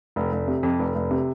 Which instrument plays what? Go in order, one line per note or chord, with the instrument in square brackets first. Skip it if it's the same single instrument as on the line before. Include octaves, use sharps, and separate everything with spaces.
[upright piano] F1
F1
C3
F2
F1
F1
C3